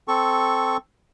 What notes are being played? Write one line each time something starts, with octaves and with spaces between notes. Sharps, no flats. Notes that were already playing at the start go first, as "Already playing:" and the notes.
C4 A4 C#6